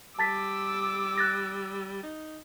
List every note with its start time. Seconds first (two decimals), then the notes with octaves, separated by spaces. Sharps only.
0.19 G3 A5 D6 E6 A6 B6
1.18 F#6 A6 A#6
2.03 D#4